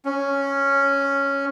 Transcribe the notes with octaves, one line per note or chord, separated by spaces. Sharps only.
C#4